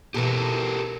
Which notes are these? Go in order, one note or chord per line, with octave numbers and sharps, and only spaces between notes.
B2 E3 G4 A4 A#4